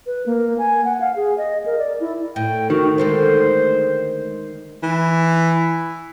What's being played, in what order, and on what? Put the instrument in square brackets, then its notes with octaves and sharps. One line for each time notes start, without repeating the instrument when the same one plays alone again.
[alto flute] B4
A#3
G#5
F#5
F5
G#4
D#5
A#4
D5
E4
[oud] A2 [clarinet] G5
[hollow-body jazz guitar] D#3 [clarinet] F#4
[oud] D2 G#3 A4 [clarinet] C5
[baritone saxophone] E3